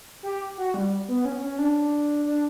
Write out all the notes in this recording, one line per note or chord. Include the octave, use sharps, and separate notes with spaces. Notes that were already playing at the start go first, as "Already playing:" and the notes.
G4
F#4
G3
B3
C#4
C#4
D4
D4